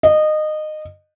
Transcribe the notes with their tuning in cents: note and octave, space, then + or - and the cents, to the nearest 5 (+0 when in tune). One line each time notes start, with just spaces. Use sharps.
D#5 -20